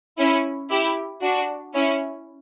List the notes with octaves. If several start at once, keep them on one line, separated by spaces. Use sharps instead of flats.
C#4 E4
E4 G4
D4 F#4
C#4 E4